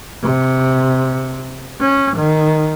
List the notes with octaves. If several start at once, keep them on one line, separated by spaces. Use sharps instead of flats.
C3
C#4
D#3